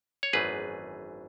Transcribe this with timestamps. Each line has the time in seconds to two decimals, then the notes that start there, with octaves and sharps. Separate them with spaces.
0.23 C#5
0.33 G#1 F#2 E3 A3 G#4 B4